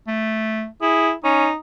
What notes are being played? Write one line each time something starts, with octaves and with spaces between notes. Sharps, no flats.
A3
E4 G#4
C#4 D#4